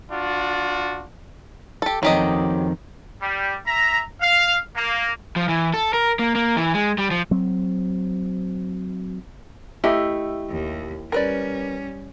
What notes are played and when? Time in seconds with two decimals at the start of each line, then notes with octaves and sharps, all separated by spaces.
0.11 D4 F4 F#4
1.82 G4 A4
2.03 F2 D#3 F#3 G4 D#5
3.21 G3
3.66 E5 A#5
4.21 F5
4.76 A#3
5.36 F3
5.49 E3
5.74 A4
5.94 A#4
6.19 A#3
6.35 A#3
6.56 E3
6.74 G#3
6.98 G3
7.11 F3
7.31 F#3 C4
9.84 A3 E4 G4 D#5
10.50 D#2
11.12 G3 C#4 A#4 B4 D5